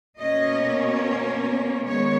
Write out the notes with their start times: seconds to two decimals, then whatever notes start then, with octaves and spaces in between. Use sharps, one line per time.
0.18 B2 A#3 C#4 D#5
1.86 D#3 G#3 B3 C#5